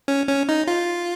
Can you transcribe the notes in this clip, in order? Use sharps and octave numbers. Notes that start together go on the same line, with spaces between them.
C#4
C#4
D#4
F4